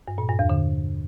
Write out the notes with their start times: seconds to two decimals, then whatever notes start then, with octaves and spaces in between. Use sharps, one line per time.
0.08 G2
0.18 A#2
0.29 G2
0.39 E2
0.50 D3